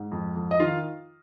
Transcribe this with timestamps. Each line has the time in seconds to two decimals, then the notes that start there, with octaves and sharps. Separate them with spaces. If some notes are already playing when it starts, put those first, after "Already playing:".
Already playing: G#2
0.12 F2
0.36 F2
0.51 D#5
0.60 D#3 F4 F5